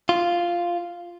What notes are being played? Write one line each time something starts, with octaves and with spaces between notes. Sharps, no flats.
F4